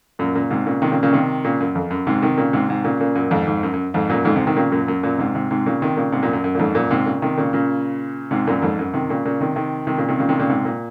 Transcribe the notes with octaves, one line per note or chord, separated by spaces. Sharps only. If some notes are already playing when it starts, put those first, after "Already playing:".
F#2 A#2
A#2 C#3
G#2 C3
A#2 C#3
C3 D#3
A#2 C#3
A#2 C#3
C3 D#3
A#2 C#3
F#2
F2
F#2
G#2 C3
C3 D#3
A#2 C#3
G#2 C3
G#2 C3
A#2 C#3
A#2 C#3
F#2 A#2
F2 G#2
F2 G#2
F#2
F#2
F2 G#2
F#2 A#2
F2 G#2
G#2 C3
C3 D#3
A#2 C#3
F#2 A#2
F#2
F#2 A#2
G#2 C3
G#2 C3
G#2 C3
A#2 C#3
C3 D#3
A#2 C#3
G#2 C3
F#2 A#2
F#2
F#2
A#2
F2 G#2
F#2 A#2
G#2 C3
A#2 C#3
C3 D#3
A#2 C#3
A#2 C#3
G#2 C3
F#2 A#2
F2 G#2
F#2
C3 D#3
A#2 C#3
A#2 C#3
C3 D#3
C3 D#3
C3 D#3
A#2 C#3
C3 D#3
A#2 C#3
C3 D#3
A#2 C#3
G#2 C3
A#2